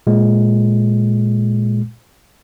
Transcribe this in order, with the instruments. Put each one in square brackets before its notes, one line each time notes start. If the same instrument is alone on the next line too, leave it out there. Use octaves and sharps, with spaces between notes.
[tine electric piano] A#2 G#3